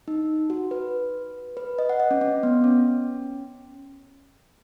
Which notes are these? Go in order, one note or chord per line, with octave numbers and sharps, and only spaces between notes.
D#4
F#4
B4
B4
D#5
F#5
D#5
C#4
C#4
B3
C#4